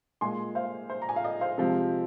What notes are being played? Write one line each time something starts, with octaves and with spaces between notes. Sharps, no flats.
A#2 G#3 G#5 C6
C5 F5
C5
A#5
G#5
F5
D#5
C5 F5
C3 F3 G#3